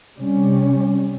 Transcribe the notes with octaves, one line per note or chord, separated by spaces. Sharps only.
C3 G3 C#4